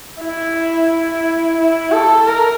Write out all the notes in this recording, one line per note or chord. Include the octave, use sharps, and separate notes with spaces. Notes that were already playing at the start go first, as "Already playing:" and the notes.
E4
E4
E4
A4
A#4